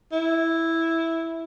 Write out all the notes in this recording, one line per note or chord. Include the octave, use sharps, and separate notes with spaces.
E4